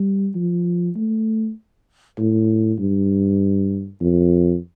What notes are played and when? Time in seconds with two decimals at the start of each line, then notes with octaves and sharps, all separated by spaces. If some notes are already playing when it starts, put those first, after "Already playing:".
Already playing: G3
0.35 F3
0.96 A3
2.19 A2
2.79 G2
4.01 F2